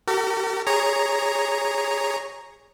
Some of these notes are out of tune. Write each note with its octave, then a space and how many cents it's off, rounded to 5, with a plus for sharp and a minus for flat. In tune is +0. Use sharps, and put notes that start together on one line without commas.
G4 -40 A#4 -45
G#4 -15 C#5 +0 A#5 +0